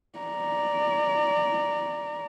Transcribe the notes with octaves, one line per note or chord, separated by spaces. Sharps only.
D5 A#5